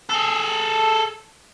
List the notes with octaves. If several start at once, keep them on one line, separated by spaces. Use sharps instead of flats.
G#4 A4